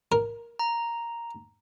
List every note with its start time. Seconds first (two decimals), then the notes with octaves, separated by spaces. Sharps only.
0.12 A#4
0.59 A#5